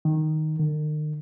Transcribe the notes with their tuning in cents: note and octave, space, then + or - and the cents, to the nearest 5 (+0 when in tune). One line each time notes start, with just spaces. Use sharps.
D#3 +0
D#3 -40